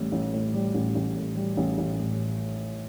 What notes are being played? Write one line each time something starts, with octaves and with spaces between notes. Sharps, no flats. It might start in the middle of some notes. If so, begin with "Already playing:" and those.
Already playing: A1 A2 G3
A1
A2
G3
A1
A1
A2
G3
A1
A1
A2